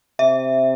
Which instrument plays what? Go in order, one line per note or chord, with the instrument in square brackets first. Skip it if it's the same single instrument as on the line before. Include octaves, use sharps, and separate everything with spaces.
[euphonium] C3 [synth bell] E5